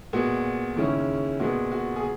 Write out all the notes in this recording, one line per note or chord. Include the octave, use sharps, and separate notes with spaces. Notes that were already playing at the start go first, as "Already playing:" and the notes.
A#2 G#3 B3 F#4
D#2 C#3 G#3 C#4 E4
A#2 G#3 B3 F#4
F#4
G#4